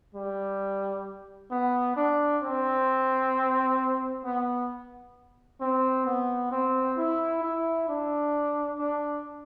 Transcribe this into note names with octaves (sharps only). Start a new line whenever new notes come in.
G3
B3
D4
C4
B3
C4
B3
C4
E4
E4
D4
D4